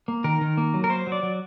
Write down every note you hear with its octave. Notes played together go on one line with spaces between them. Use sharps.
A#3
D#3 A#4
D#3
A#3
F#3
A#4
A#3 C5
F#3
D5
F#3